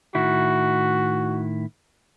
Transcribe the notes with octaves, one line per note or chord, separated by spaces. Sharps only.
A2 D#3 E4 F#4